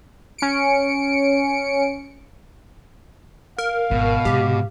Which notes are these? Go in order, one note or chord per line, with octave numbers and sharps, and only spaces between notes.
C#4 C#7 D7
A#4 F5
G#1 B2
G#2 C3 G4